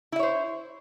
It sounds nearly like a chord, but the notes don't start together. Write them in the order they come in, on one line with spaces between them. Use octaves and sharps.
E4 E5 C#5 C5